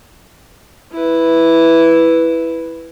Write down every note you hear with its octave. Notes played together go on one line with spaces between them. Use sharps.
E4 B4